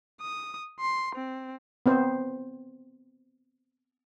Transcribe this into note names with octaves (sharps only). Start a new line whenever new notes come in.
D#6
C6
C4
B3 C4 C5